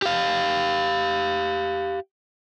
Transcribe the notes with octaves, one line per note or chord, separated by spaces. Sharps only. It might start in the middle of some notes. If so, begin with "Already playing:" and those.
G4 F5